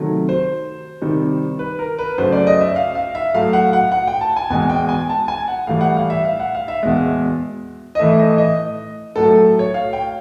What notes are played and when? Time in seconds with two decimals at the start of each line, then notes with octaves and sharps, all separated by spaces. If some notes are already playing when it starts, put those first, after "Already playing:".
Already playing: C3 D#3 F#3 A3
0.29 C5
1.02 C3 D#3 G3
1.59 B4
1.79 A#4
1.99 B4
2.18 F#2 C#3 F#3 A3 C5
2.32 D5
2.47 D#5
2.61 E5
2.76 F5
2.95 F5
3.15 E5
3.34 A2 F#3 A3 F5
3.53 F#5
3.73 F#5
3.92 F#5
4.07 G5
4.21 A5
4.36 G#5
4.50 E2 B2 G#3 G#5
4.70 G5
4.89 G#5
5.09 A5
5.28 G#5
5.48 F#5
5.67 A2 E3 G3 F5
5.81 F#5
5.97 F5
6.10 E5
6.25 F5
6.40 F#5
6.55 F5
6.68 E5
6.83 E2 B2 G#3
7.95 D#5
7.99 A2 E3 A3 E5
8.19 D#5
8.38 D#5
9.16 A2 F#3 A3 A4
9.31 A4
9.59 C#5
9.74 F5
9.93 G5